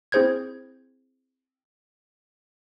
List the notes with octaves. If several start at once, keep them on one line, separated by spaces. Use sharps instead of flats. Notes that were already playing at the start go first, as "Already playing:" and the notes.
C4 E4 G#4 C5 G6 G#6